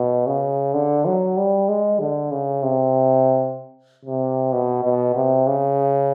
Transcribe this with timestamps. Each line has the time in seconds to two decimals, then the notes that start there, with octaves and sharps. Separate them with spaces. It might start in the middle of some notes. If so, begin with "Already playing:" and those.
Already playing: B2
0.27 C#3
0.74 D3
1.06 F#3
1.37 G3
1.69 G#3
2.00 D3
2.32 C#3
2.63 C3
4.05 C3
4.52 B2
4.84 B2
5.15 C3
5.47 C#3